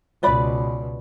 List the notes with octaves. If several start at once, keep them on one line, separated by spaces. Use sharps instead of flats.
C#2 B2 B4 D5 B5